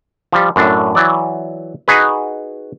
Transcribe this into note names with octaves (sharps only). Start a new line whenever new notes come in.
F3 G3
F#2 A2 D4
E3 F#3 D5
D#4 F#4 G#4 B4